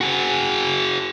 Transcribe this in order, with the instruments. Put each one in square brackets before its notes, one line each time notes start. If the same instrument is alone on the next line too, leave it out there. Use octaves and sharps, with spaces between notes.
[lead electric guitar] F#4 G#4